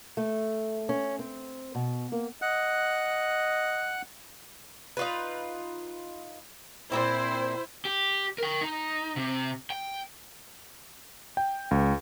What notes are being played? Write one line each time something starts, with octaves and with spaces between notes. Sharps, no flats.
A3
C#4
C4
B2
A#3
D#5 F#5 F#6
D#4 F4 B4
A#2 C#3 C4 E4 C5
G4
A#4 G5
D#4
C3
G5
G5
C#2